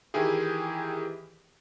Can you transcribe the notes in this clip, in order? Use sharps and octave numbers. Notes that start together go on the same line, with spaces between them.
D#3 E3 E4 G4 G#4